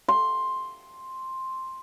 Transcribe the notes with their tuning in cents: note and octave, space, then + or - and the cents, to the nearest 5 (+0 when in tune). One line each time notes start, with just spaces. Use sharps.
C6 +5